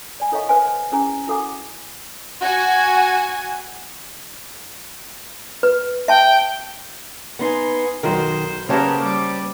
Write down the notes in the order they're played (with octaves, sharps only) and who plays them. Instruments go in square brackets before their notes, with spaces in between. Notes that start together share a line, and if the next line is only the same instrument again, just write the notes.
[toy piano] D5 G#5 B5
E4 A4 C#5 D#5 F5 C#6
B4 C5 F5 G#5 C6
C#4 E4 G#4 G#5 A#5
E4 F#4 A4 F#5 G#5 D6
[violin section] F#4 G#5
[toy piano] B4
[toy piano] E5 A5 [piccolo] G5
[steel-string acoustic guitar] B3 D#4 [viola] G#5 C6
[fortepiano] B1 F#4 A#4 [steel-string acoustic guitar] D#3 [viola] C5
[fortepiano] C#3 G4 C#5 [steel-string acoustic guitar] A#3 C5 A5 [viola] B3 A#4
[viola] G3 D6